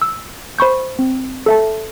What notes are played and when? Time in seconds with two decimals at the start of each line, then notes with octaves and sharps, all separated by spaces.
0.02 E6
0.59 C5 B5 C#6 G6
0.99 C4
1.46 A4 E5 A5